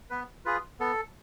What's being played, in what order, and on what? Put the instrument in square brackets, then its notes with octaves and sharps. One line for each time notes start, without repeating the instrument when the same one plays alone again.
[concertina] B3 B4
F4 G#4 B4
B3 A4